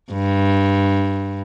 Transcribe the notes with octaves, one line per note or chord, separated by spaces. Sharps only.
G2